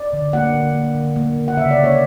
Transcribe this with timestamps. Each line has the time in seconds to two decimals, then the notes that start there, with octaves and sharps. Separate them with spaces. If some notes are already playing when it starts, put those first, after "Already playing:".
Already playing: D5
0.13 D3
0.33 A#3 F#5
0.54 D3
0.74 A#3
0.95 D3
1.16 A#3
1.36 C#3
1.48 F#5
1.57 C#3 E5
1.71 D5
1.77 A#3
1.84 C#5